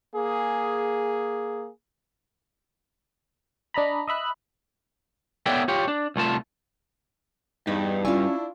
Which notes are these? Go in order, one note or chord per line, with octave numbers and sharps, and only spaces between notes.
A#3 G#4
D4 D#5 A#5 B5
D#5 E5 B5 F#6
B3 A4 C#5 D5 E5 G5
F4 G4 C#5
D4
C2 A3 F4 A5
E2 G2 B3 D#4 B5
C#4 D4 E4 F4 G#5 C#6